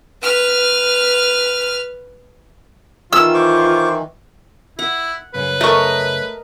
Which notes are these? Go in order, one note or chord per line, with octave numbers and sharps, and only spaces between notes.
B4 F6
D#3 E3 F4 E6
C5 C#6 D6
E4 F#5
F#2 C#3 B4
A3 A#4 D#5 C#6